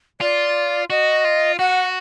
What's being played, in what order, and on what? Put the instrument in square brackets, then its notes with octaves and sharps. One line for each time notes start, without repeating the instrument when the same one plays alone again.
[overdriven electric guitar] F4 [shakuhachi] D5
[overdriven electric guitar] F#4 [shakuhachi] D#5
[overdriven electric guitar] F4
[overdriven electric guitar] F#4 [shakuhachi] F#5